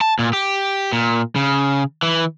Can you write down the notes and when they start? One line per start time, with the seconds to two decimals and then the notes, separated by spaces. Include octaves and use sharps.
0.01 A5
0.19 A#2
0.33 G4
0.92 A#2
1.36 C#3
2.03 E3